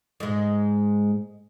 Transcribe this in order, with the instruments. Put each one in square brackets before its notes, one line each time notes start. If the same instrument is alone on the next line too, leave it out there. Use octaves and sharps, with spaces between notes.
[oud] G#2 G#3